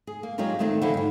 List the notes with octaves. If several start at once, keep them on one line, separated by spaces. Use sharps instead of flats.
G#4
A#3
F#3 G#3 A#3 F4 G4 A#4
D#3 G#3 A3 C4 D4 D#4
D3 F3 G#3 B3 E4
G#2 G3